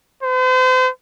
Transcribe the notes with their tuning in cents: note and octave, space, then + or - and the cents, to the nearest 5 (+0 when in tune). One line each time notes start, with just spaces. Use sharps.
C5 -40